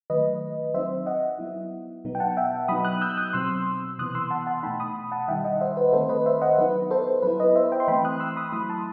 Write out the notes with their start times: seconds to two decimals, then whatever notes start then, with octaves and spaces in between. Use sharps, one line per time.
0.10 D#3 F#3 A3 B4 D#5
0.74 F#3 C4 D#4 C5 E5
1.06 D#5 F#5
1.39 F#3 B3 E4
2.05 B2 F#3 B3 D#4
2.15 G5
2.20 F#5 A5
2.37 E5 G5
2.68 F#3 B3 D#4 B5 D#6
2.85 D#6 F#6
3.02 E6 G6
3.17 D#6 F#6
3.33 B2 F#3 C4 C6 E6
3.99 C3 E3 B3 D#6 F#6
4.14 C6 E6
4.31 F#5 A5
4.47 F#5 A5
4.63 B2 A3 D#4 G5 B5
4.80 B5 D#6
5.12 F#5 A5
5.28 D#3 G3 D#4 E5 G5
5.44 D#5 F#5
5.61 C5 E5
5.77 B4
5.93 D#3 A3 C4 A4 C5
6.09 B4 D#5
6.26 C5 E5
6.41 D#5 F#5
6.58 F#3 B3 D#4 B4
6.91 A4 C5
7.22 F#3 B3 E4 B4
7.39 B4 D#5
7.56 C5 E5
7.72 E5 G5
7.80 C6
7.88 E3 A3 C4 G5 B5
8.05 D#6 F#6
8.20 C6 E6
8.36 B5 D#6
8.52 F#3 A3 E4 B5 D#6
8.69 A5 C6